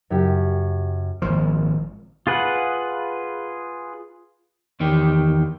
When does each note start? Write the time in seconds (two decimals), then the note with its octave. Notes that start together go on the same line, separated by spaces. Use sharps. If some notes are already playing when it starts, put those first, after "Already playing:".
0.10 F#2 C#3 E4 G4 G5
1.22 G#1 A#2 F3
2.27 F4 G#4 B4 F#5
4.80 E2 D#3 G4